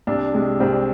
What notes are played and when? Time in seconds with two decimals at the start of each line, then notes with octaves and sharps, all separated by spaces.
0.07 C2 D4
0.34 C3 G#3
0.60 C2 C4